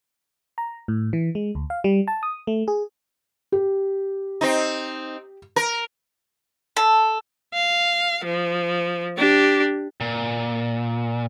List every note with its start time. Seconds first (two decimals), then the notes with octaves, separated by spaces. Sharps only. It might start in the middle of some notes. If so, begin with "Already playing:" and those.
0.58 A#5
0.88 A2
1.13 E3
1.35 G#3
1.55 D2
1.70 F5
1.84 G3
2.08 A5
2.23 D#6
2.47 A3
2.68 G#4
3.52 G4
4.41 C4 D#4
5.56 A#4
6.77 A4
7.54 F5
8.24 F3
9.17 D4 G4
10.00 A#2